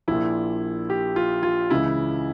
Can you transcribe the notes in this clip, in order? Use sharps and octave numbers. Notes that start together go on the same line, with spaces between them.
A#1 A#2 E4
G4
F4
F4
C#2 C#3 E3 E4